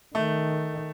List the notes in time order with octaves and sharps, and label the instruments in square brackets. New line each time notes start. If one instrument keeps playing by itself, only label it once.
[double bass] D#3 [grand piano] A3